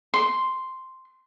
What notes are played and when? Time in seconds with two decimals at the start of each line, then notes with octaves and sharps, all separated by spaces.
0.14 C6